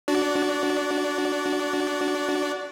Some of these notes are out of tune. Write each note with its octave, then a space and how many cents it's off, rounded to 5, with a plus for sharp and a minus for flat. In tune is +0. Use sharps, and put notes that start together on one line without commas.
D4 -5 F#4 +0 D5 -25